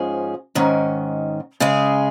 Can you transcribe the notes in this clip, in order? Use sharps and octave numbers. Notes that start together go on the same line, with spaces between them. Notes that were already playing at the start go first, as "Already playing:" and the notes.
Already playing: G#2 F3 C#4 G#4
G#2 D#3 C#4
C#3 G#3 C#4 G#4